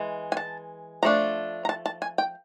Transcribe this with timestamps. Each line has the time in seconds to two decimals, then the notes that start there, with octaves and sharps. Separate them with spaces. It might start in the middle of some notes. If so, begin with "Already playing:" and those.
Already playing: E3 G#3
0.32 G#5
0.37 A5
1.03 F3 A3 D4 A#5
1.65 A#5
1.69 A5
1.86 A5
2.02 G#5
2.18 G5